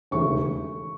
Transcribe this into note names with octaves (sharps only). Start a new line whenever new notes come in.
E1 D#2 C#3 E3 A3 C#6